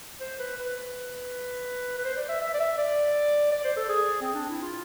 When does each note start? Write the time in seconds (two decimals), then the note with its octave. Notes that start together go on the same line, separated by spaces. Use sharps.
0.20 C5
0.39 B4
0.58 B4
1.98 B4
2.05 C5
2.17 D5
2.29 E5
2.41 E5
2.54 D5
2.60 E5
2.78 D5
3.52 D5
3.65 C5
3.77 A4
3.89 G#4
4.21 C4
4.34 D4
4.49 E4
4.62 F4